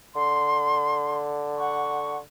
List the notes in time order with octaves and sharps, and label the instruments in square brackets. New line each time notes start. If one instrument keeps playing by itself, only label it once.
[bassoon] D3 [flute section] C6
[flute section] F#5 C#6